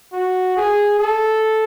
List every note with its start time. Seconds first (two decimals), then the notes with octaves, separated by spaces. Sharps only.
0.13 F#4
0.57 G#4
1.00 A4